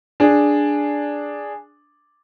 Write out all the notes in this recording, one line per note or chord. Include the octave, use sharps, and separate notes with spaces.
D4 G#4